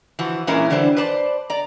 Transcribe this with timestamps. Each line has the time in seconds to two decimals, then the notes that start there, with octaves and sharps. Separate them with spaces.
0.19 E3 F3 F#4
0.47 A#2 E3 G#3 C#4 E4 A#4
0.70 D3 E3 G3 D4 C5
0.97 B4 C5 D5 A5
1.50 D5 A#5